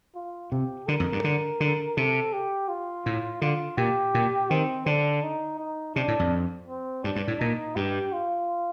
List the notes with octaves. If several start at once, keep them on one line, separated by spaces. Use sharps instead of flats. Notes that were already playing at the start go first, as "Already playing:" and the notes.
F4
C3 G4
D3 A#4
F2
G2
D3
D3
C3 A4
G4
F4
A2
D3 F4
A#2 G4
A#2
D#3 C4
D3 D4
D#4
D#4
C3 D4
A2
F2
C4
G2 D4
G2
A2
A#2 D#4
G2 G4
F4